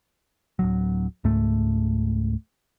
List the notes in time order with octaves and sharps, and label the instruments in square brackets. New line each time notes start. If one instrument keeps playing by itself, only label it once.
[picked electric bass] D1 G1 F#3
C#2 G#2 A3